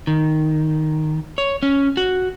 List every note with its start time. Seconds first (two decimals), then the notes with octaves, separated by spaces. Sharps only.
0.07 D#3
1.38 C#5
1.63 C#4
1.97 F#4